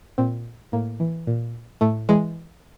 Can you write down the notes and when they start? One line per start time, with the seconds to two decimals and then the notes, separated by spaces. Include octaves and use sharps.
0.18 A#2 C4
0.72 A2 A#3
1.00 E3
1.27 A#2
1.81 A2 A3
2.09 E3 G#3